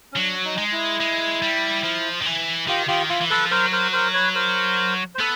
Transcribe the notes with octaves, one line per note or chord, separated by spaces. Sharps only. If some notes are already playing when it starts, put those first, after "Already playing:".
C#4
F#3 D4
D#4
G#3
E4
G#3
G3
F3
D#3
E3
D#3 F4 G4
D#3 F4 G4
E3 F4
E3
F3 A4 B4
F#3 A#4 C5
A#4 C5
A#4 C5
B4 C#5
A#4 C5
C5
B3 A4 B4